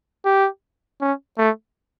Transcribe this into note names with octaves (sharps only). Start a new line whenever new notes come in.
G4
C#4
A3